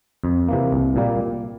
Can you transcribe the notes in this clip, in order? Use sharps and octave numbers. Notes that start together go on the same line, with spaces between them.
F2
C3 E3 A#3
C2
A#2 G3 A#3